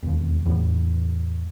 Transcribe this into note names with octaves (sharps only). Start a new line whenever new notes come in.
E1 D#2
E2 A2